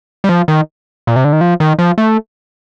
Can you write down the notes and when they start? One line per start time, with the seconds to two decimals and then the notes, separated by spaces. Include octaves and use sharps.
0.24 G3
0.29 F3
0.48 D#3
1.07 A#2
1.16 C3
1.25 D3
1.33 D#3
1.41 F3
1.60 D#3
1.79 F3
1.98 A3